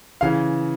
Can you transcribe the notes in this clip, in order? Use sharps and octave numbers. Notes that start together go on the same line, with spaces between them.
C#3 E3 F5